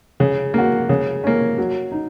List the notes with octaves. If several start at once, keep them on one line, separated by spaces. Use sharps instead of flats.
C#3
A#3 F#4
C#3
A#3 C#4
F#3
D#4